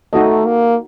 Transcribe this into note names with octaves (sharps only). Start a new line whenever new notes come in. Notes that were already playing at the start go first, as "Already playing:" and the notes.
A3 D#4 F#4 A4 D#5
A#3